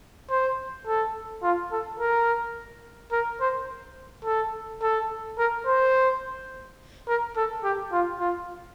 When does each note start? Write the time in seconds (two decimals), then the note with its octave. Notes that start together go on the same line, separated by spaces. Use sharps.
0.30 C5
0.87 A4
1.43 F4
1.72 A4
1.99 A#4
3.12 A#4
3.41 C5
4.25 A4
4.82 A4
5.38 A#4
5.67 C5
7.08 A#4
7.36 A4
7.64 G4
7.92 F4
8.20 F4